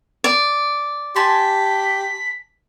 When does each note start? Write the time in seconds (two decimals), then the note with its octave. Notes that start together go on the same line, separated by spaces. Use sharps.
0.24 D5
1.16 G4 G#5 A5 C6 B6